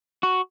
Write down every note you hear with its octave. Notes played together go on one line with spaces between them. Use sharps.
F#4